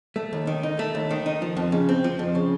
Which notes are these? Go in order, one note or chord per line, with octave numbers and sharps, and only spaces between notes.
A3
D#2
D#3
D#4
A3
D#2
D#3
D#4
F3
F2
C#3
C4
F3
F2
C#3